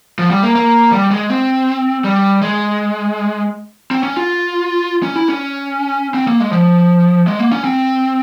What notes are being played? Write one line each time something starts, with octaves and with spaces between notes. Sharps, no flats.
F3
G3
A#3
A#3
G3
G#3
C4
G3
G#3
C4
C#4
F4
C#4
E4
C#4
C4
A#3
G#3
F3
G#3
A#3
C#4
C4